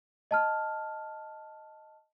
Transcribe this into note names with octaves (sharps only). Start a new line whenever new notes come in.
D#5 A5 F6